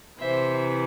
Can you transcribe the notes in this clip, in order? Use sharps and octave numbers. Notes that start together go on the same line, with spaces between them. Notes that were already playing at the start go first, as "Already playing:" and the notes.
C3 E3 C5 E5